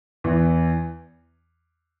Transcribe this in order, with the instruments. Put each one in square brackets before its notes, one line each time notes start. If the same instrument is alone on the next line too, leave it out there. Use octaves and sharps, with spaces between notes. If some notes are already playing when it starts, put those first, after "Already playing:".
[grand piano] E2 E3